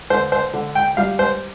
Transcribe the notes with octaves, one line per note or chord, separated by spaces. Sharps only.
D3 C5
C5
D3
G5
G3 F5
C5